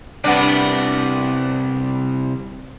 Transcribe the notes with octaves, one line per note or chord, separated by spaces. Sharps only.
C2 C3 B3 D4